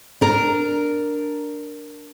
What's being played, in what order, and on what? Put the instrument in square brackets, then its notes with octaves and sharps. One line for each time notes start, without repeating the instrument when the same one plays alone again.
[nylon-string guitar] D4 A#4